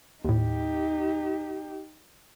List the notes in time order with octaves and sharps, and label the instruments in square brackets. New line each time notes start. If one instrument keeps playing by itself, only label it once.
[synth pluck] D#2 A2 [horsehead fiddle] D#4 G4